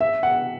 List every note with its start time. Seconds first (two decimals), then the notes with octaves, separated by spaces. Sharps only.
0.01 E5
0.23 F#5